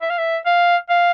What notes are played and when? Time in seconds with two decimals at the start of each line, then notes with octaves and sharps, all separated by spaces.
0.02 E5
0.10 F5
0.18 E5
0.46 F5
0.90 F5